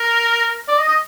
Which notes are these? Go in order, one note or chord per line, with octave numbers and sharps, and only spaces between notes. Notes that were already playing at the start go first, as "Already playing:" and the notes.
Already playing: A#4
D5
D#5
D#5